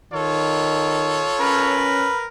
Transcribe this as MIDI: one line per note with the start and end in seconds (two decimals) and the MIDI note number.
0.13 1.27 51
0.13 1.91 65
0.13 1.91 69
0.13 1.91 73
1.40 2.08 61
1.40 2.26 70
1.40 2.26 71